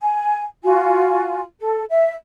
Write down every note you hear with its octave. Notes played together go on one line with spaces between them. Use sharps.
G#5
F4 F#4 G#5
A4
E5